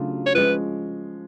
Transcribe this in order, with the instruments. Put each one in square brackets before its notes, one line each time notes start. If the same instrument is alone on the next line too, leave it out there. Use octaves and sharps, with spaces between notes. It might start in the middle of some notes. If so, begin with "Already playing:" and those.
Already playing: [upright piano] C#3 F#3 A3 D4 F4
[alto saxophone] C#5
[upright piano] F3 G#3 C#4 [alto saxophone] B4